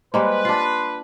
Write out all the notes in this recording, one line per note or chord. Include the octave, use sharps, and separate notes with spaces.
G3 G#3 A#3 B4 C5 D#5 C6
D4 F4 C6 C7